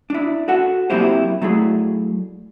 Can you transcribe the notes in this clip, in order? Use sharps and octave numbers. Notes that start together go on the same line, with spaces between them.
D4 E4
F#4 A4 F#5
F#3 A#3 C4 E4 G4 C5
F#3 A3 E4 G#4